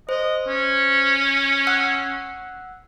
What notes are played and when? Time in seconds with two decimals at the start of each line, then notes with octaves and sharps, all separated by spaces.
0.09 C5 D#5
0.47 C#4
1.67 F#5 E6 F#6